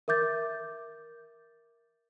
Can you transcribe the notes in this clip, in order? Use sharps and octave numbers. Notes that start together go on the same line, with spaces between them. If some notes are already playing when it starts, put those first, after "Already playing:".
A#4 E5 D6 G6 A6